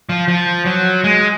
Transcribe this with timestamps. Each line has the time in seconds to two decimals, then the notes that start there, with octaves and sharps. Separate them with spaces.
0.09 F3
0.28 F3
0.66 F#3
1.04 G#3